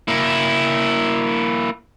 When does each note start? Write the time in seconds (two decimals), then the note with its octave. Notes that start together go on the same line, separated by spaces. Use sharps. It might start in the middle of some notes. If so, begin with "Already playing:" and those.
0.08 A#3 E4